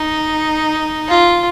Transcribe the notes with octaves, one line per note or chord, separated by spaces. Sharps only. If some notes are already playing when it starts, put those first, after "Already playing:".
Already playing: D#4
F4